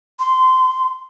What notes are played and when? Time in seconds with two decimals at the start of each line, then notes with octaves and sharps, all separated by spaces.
0.20 C6